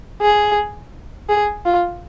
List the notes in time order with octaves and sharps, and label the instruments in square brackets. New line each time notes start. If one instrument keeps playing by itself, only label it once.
[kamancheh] G#4
G#4
F4